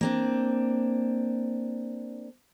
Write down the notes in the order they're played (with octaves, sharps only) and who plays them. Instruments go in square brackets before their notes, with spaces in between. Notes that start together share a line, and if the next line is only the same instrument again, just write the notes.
[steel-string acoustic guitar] A#3 C4 D4